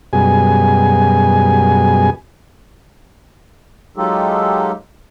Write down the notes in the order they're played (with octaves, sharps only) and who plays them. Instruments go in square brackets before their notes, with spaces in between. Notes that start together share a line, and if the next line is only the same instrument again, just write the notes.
[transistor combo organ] F#2 B2 G3 G#4 G#5
[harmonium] F#3 G#3 D#4 F4 G4 A4